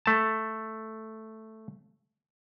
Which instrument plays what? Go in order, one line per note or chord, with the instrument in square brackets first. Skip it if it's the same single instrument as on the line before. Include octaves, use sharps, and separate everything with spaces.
[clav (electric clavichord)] A3 A5